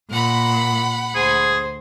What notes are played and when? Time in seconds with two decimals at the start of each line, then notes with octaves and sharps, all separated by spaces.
0.11 A#2 F#5 B5
1.15 D2 G#4 C5